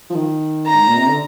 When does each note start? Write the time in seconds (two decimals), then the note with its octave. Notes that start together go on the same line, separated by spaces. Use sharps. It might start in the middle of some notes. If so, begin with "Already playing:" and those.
0.10 F3
0.15 D#3
0.67 A#5
0.75 G#2
0.86 A#2
0.97 C3
1.07 D3